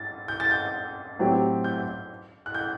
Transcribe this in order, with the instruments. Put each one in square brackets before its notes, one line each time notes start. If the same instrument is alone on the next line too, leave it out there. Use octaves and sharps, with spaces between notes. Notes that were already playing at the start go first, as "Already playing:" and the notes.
Already playing: [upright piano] A6
G6
A6
G6
[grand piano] A2 F#3 C4 G4
[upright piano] G6
F#6
G6